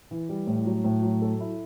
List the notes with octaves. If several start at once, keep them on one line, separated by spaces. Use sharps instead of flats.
E3
G3
A2
F#3
A2
F#3
A4
E4